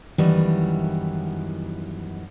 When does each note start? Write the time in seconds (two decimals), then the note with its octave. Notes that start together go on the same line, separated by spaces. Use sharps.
0.18 F#2 D#3 E3 G3 B3 E4